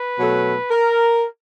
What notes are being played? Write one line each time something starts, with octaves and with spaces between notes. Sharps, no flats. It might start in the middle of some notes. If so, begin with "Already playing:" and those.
Already playing: B4
B2 F#3 A3
A#4